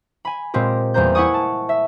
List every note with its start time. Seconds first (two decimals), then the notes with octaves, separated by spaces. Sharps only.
0.25 G#5 B5
0.54 A#2 G#3 C4 G4 A#4
0.94 E2 G3 A#3 C5 A#5 G6
1.15 E4 F#5 G#5 C#6 D#6
1.34 A5
1.69 E5